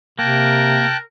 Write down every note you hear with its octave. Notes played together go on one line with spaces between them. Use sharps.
C3 A#3 A#4 G5 A5 F#6